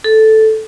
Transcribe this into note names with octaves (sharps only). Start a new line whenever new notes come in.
A4